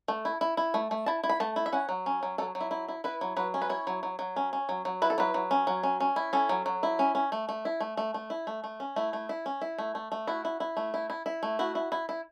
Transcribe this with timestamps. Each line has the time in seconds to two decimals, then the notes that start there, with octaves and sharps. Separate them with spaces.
0.08 A3
0.25 E4
0.41 E4
0.57 E4
0.74 A3
0.91 A3
1.06 E4 A5
1.24 E4
1.29 B5
1.40 A3 A5
1.56 E4
1.66 E5
1.72 C#4 F#5
1.89 F#3
2.06 C#4
2.23 F#3
2.38 F#3 A4
2.55 F#3
2.61 E4
2.71 E4
2.88 E4
3.04 E4 B4
3.21 F#3
3.37 F#3 B4
3.54 C#4
3.62 B4
3.69 E4 C#5
3.87 F#3
4.03 F#3
4.19 F#3
4.36 C#4
4.53 C#4
4.69 F#3
4.85 F#3
5.02 E4 B4
5.10 A4
5.18 F#3 B4
5.34 F#3
5.51 C#4
5.67 F#3
5.83 C#4
6.00 C#4
6.16 E4
6.33 C#4 A4
6.49 F#3
6.66 F#3
6.83 E4
6.99 C#4
7.15 C#4
7.32 A3
7.49 A3
7.65 E4
7.80 A3
7.97 A3
8.14 A3
8.30 E4
8.47 A3
8.64 A3
8.80 C#4
8.96 A3 E4
9.13 A3
9.29 E4
9.46 C#4
9.62 E4
9.79 A3
9.95 A3
10.12 A3
10.27 E4 F#4
10.45 E4
10.60 E4
10.77 A3
10.94 E4
11.10 E4
11.26 E4
11.43 A3
11.59 E4 F#4
11.75 E4
11.92 E4
12.09 E4